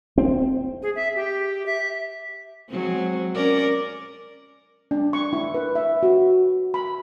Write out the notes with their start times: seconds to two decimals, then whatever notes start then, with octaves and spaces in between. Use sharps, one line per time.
0.18 C4
0.82 G#4
0.95 E5
1.15 G4
1.66 E5
2.69 F#3 G#3 C4
3.35 C#4 A#4 D5
4.91 D4
5.13 C#6
5.33 E4
5.54 B4
5.75 E5
6.03 F#4
6.74 B5